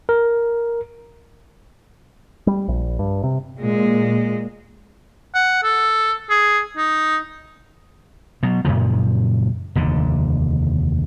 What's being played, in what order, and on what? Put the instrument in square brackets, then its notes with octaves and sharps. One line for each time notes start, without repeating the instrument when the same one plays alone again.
[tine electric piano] A#4
[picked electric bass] G3
A#1
G2
C3
[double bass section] A#2 [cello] G#3
[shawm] F#5
A4
G#4
D#4
[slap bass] B2 F#3
F#2 A#2 C#3 F3
F1 D#2 D3